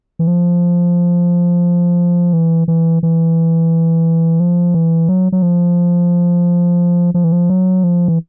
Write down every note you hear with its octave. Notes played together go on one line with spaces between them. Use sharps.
E3
F3
E3
E3
E3
F3
E3
F#3
F#3
F3
F3
E3
F3
F#3
F3
E3